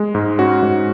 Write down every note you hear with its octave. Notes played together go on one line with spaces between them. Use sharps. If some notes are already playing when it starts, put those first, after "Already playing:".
Already playing: G#3
G#2
C#4 F#4
G#2